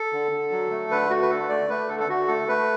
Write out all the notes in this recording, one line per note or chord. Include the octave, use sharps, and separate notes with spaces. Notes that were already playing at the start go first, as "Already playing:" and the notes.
Already playing: A4
D3
D3
F#3
A3
D3 B4
A3 F#4
B4
D3 A4
A3 D5
A3 B4
D3 A4
A4
D3 F#4
A3 A4
A3 B4